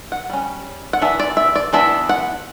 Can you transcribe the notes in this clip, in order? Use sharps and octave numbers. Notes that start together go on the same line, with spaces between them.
F#5
G3 C#4
F#5
E3 B3 D4 E5
D5
E5
D5
E3 B3 D4 E5
F#5